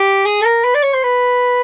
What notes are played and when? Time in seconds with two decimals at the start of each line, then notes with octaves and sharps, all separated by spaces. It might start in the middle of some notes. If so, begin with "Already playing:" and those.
Already playing: G4
0.25 G#4
0.41 A4
0.45 A#4
0.64 B4
0.74 D5
0.83 C#5
0.93 C5
1.03 B4